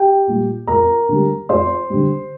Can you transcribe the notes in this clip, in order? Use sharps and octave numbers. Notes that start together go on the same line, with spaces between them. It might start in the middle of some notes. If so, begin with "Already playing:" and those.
Already playing: G4 G5
A#2 G3
F2 A#4 A#5
D3 G3
F2 C5 C6
D3 G3